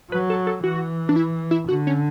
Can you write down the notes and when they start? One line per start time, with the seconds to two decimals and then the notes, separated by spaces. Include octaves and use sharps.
0.11 F#3 B4
0.30 A4
0.47 A4
0.64 E3 F#4
1.09 D4
1.16 E4
1.51 E4
1.68 D3 F#4
1.87 C#4